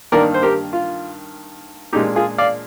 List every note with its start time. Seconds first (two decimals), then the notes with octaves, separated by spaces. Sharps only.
0.12 G2 D#3 A#3 A#4 D5
0.34 C5
0.43 G4 A#4
0.73 F4
1.93 A#2 G#3 D4 D#4 G4
2.16 F4 G#4
2.38 D5 F5